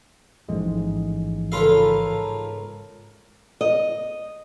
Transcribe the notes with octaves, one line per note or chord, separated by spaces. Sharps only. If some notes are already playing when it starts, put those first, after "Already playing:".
A1 F2 G#2 G#3
C#2 F4 A4 A#4 F5 B5
D#5